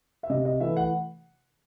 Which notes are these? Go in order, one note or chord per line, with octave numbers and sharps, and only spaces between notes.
E5
C3 D#5
D#5
E3 A3 E5
F#5